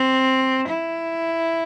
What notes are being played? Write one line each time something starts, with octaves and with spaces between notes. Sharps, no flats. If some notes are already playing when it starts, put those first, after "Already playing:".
Already playing: C4
E4